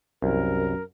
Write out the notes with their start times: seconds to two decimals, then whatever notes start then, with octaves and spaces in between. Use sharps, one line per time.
0.22 C2 F#2 A#4